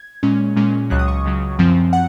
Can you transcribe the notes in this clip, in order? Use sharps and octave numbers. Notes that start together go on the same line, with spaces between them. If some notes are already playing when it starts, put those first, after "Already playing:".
Already playing: G#6
A#2 G#3 C#4
A#2 G#3 C#4
C#2 C#3 F#3 F#6
D#6
C#6
C#2 C#3 F#3
F#2 F3 C4
F#5